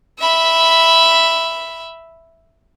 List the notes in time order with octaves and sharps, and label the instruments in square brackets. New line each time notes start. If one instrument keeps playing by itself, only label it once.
[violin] E5 B5